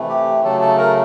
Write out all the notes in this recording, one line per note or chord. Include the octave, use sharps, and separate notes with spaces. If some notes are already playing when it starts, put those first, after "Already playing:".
Already playing: C3 E3 A3
G4
C#3 F#3 A3 A4
A4
A#4